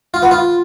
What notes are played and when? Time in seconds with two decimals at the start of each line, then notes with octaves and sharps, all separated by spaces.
0.14 F4
0.22 B3
0.31 F4